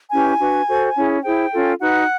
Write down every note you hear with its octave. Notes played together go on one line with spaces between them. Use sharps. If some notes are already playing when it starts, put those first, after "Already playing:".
C#4 E4 G4 B4 G#5
D4 F#4 B4
F#4 A4 C5
C#4 E4 G#4
E4 G#4 C5 G5
C#4 F4 A4
D#4 F#4 B4 F#5